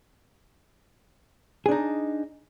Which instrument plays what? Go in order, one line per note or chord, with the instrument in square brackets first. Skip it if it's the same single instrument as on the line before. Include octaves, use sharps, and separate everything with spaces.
[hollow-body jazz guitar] G#4
D4
D#4